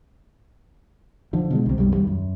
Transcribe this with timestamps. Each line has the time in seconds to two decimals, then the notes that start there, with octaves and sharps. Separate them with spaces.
1.33 D3 F3
1.50 B2 D3 G#3
1.66 C2 C3
1.78 B1 F#2 G3
1.94 D#2 G3
2.07 F#2